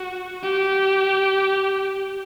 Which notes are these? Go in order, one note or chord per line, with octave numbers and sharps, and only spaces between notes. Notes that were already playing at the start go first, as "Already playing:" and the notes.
Already playing: F#4
G4